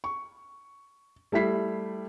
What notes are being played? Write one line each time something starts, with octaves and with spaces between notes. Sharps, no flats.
C#6
G3 A3 E4 B6 C7